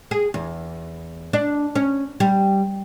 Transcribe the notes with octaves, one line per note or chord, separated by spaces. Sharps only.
G#4
E2
D4
C#4
G3